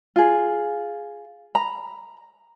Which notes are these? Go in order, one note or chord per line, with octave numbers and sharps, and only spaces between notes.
F4 G#4
A#5 B5